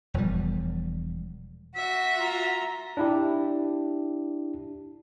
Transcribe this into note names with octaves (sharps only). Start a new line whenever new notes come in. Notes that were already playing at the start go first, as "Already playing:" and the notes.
E1 F3 G3
F#4 E5 B6
F4 A#5
D4 E4 G4